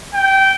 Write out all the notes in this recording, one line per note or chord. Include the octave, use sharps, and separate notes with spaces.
G5